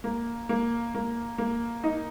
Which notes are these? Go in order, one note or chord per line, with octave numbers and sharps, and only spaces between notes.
A#3
A#3
A#3
A#3
D#4